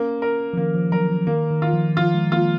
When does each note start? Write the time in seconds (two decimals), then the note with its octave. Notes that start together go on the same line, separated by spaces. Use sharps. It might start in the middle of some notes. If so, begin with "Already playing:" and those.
Already playing: A#3 C#4
0.22 A#4
0.53 F3
0.57 D#3 A#3
0.74 F3
0.92 F#3 A#4
1.09 F3
1.27 D#3 A#3
1.50 D#3
1.62 D#3 F4
1.73 F3
1.97 F3 F4
2.14 G#3
2.32 A#3 F4